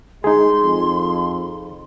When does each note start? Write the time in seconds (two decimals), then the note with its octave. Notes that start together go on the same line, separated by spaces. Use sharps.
0.24 G#3 D#4 G#4 C6
0.62 F2